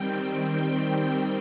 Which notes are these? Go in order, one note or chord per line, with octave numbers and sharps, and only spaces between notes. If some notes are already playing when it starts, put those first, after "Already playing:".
Already playing: D#3 G3 C4 G5
G5